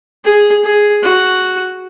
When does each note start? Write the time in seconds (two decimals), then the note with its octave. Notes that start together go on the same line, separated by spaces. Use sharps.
0.25 G#4
0.64 G#4
1.03 F#4